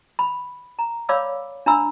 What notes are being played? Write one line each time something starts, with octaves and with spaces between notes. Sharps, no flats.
B5
A#5
C#5 D5 F5 B5 D6 E6
D4 E5 A#5 B5 E6